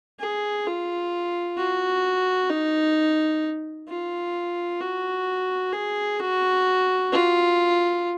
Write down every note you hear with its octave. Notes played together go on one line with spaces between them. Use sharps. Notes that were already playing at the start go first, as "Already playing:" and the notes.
G#4
F4
F#4
D#4
F4
F#4
G#4
F#4
F4